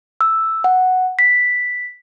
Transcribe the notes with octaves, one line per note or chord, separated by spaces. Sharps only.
E6
F#5
B6